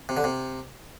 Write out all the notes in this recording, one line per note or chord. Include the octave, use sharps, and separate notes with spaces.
C3
D3
C3